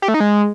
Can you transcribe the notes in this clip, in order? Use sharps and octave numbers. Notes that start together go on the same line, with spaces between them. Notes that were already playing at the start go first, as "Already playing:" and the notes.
G4
A3
D#4
G#3